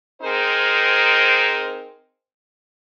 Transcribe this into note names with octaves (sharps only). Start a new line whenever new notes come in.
C4 D#4 G#4 A#4 C5